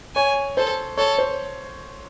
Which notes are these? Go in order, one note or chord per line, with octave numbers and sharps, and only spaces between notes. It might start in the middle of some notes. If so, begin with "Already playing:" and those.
C#5 G#5
A4 C5
A4 C#5
C5